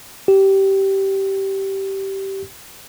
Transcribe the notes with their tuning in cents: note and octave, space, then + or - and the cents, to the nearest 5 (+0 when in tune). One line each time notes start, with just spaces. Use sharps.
G4 -15